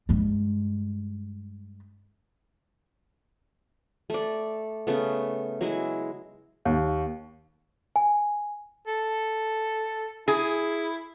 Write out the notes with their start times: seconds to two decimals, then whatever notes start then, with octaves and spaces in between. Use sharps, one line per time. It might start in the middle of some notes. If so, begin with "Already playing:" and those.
0.09 G2 G#3
4.10 A3 D5
4.87 C#3 A3 B3
5.61 F#3 G#3 E4
6.65 D#2
7.96 G#5
8.87 A4
10.28 E4 G#4